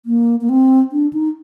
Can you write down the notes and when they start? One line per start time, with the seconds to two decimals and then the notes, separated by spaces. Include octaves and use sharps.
0.06 A#3
0.41 A#3
0.49 C4
0.92 D4
1.13 D#4